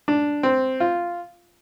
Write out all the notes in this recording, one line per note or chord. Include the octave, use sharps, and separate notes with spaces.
D4
C4
F4